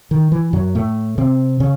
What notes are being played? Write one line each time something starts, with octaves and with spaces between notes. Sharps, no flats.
D#3
E3
F#2 F#3
A2 A3
C3 C4
C#3 C#4